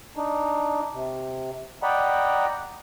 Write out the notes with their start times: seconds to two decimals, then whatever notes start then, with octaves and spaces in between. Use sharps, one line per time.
0.16 D4 D#4
0.93 C3
1.83 D5 D#5 F#5 G5 A#5 B5